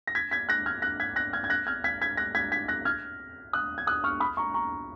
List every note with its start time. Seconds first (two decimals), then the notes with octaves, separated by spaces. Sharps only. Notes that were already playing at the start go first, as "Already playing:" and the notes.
0.07 A#6
0.15 G#6 B6
0.31 G#6 B6
0.49 F#6 A#6
0.66 F6 G#6
0.82 F#6 A#6
1.00 G#6 B6
1.16 F#6 A#6
1.33 F6 G#6
1.44 G#6
1.50 F#6 A#6
1.67 F6 G#6
1.84 G#6 B6
2.01 G#6 B6
2.17 F#6 A#6
2.35 G#6 B6
2.52 G#6 B6
2.68 F#6 A#6
2.85 F6 G#6
3.53 D#6 F#6
3.78 G#6
3.87 D#6 F#6
4.04 C#6 F6
4.20 B5 D#6
4.37 A#5 C#6
4.54 A#5 C#6